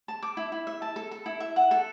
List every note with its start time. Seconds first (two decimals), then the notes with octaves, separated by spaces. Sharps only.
0.08 A5
0.23 D6
0.37 E4
0.52 E4
0.67 E5
0.82 A5
0.96 A4
1.11 A4
1.26 E4
1.40 E5
1.56 F#5
1.71 A4